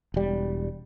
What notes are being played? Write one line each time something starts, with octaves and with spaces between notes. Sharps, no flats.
E1 G3